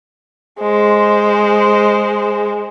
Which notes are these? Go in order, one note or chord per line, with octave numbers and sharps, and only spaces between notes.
G#3 C5